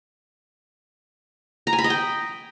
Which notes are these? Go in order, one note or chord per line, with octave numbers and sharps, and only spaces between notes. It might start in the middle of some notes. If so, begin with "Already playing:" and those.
A#5
G#5
B5
D#5
G5